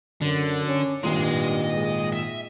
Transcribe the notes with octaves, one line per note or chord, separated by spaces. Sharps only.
F#2 D3
C#4
G#1 G2 A#2 D#5 C6
G#3
E5